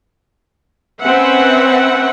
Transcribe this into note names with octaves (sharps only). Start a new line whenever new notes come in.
C4 C#4 B4 E5 F#5